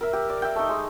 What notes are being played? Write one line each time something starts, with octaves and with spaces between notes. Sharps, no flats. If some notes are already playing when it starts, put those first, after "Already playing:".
A#4 E5
G4
D5
E5 G5
A3 D#4
G#3